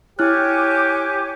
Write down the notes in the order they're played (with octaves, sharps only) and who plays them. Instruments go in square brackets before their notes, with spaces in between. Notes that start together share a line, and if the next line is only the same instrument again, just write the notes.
[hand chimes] E4 F6 F#6 [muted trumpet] G4 [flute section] C#5 G#5 D6